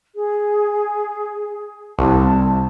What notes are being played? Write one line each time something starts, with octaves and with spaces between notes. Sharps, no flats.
G#4
C2 A5